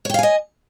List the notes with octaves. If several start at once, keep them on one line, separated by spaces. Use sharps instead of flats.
C#5 D#5 F5 G5 G#5